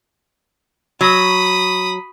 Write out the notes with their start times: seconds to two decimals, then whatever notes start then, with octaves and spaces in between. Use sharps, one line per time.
1.01 F#3 B5 D#6